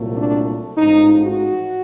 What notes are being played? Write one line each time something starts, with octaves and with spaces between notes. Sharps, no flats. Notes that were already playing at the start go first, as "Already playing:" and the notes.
Already playing: C2 A#2 F#3 A3
D4
A1 G#2 F3 D#4
F#4